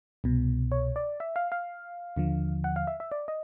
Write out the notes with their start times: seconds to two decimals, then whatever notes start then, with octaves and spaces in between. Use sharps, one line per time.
0.24 C2 B2
0.72 C#5
0.96 D5
1.20 E5
1.36 F5
1.52 F5
2.16 D#2 D3 F3
2.64 F#5
2.76 F5
2.87 E5
3.00 E5
3.12 D5
3.28 D#5